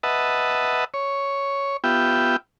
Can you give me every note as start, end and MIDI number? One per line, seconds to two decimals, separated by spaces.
0.03 0.84 71
0.03 0.84 75
0.03 0.84 76
0.03 0.84 78
0.03 0.84 81
0.94 1.77 73
1.84 2.36 59
1.84 2.36 65
1.84 2.36 67
1.84 2.36 76
1.84 2.36 79